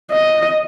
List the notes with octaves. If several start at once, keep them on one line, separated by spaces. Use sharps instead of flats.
D#5